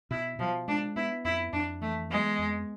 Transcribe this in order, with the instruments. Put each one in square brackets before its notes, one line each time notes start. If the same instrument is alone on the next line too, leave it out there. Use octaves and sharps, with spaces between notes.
[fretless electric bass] B2 [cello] E4
[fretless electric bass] B2 [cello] F3
[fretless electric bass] G#3 [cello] D4
[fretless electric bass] B3 [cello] E4
[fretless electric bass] F2 [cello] E4
[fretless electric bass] F2 [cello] D4
[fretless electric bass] E3 [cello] A3
[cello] G#3 [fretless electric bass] B3
[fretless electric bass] F2